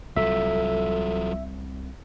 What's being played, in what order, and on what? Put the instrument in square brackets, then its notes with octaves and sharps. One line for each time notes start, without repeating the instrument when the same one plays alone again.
[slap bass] C2 [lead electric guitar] F#3 F4 [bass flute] A4 [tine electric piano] E5